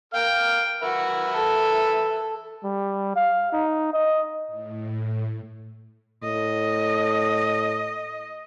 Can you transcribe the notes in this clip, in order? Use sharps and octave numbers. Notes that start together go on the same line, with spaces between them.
A#4 F5 G5 F6
F#4 A#4 B4 E5
A4
G3
F5
D#4
D#5
A2
A2 D#5